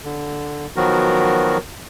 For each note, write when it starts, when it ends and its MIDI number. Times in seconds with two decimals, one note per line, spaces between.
0.04 0.67 50
0.76 1.58 51
0.76 1.58 53
0.76 1.58 54
0.76 1.58 59
0.76 1.58 66
0.76 1.58 70